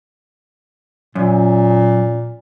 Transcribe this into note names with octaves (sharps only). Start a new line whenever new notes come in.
F#2 A#2